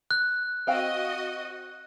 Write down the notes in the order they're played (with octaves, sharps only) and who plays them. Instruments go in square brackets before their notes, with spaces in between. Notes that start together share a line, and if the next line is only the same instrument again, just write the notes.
[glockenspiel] F#6
[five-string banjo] C4 F5 G5 [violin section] F#4 D#5